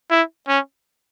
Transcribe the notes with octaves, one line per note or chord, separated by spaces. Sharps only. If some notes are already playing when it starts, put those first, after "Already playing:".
E4
C#4